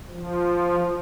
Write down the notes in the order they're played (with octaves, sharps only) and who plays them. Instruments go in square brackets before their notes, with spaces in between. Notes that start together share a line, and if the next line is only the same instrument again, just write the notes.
[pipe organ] F3